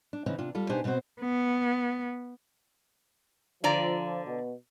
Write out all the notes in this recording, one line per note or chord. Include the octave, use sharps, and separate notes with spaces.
D4
C#3 E3 C4 C#4 D#4
C3 D4 F4
G3 F4 A4
B2 D4 D#4 G4 C5 G#5
B2 B3 C4 F#4 C5
B3
D3 F3 D5 A#5
B2